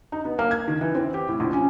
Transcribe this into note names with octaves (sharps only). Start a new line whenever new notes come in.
D#4
B3
A#3
G#6
D#3
E3
C4
G4
A2
A#1
C#4